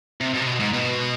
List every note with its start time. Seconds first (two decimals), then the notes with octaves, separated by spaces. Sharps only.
0.21 C3
0.34 B2
0.40 C3
0.46 B2
0.60 G#2
0.73 B2